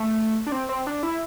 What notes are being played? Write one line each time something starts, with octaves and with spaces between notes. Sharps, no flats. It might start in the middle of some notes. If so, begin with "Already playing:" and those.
Already playing: A3
D4
C4
C4
D4
E4